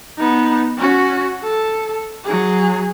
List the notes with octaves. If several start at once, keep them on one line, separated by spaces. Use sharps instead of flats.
B3 D#4
C#4 F#4
A4
F#3 G#4